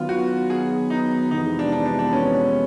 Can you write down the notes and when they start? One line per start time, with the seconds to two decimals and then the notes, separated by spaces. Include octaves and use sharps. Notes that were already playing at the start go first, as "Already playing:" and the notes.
Already playing: D#3 F#3 B3 F4
0.09 F#4
0.50 G#4
0.90 D#4
1.31 F2 C3 E3 G#3 B3 D#4
1.59 D4
1.72 D4
1.86 D4
1.99 D4
2.13 C#4